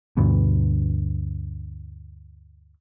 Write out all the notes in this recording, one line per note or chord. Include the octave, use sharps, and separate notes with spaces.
D2 G2 B2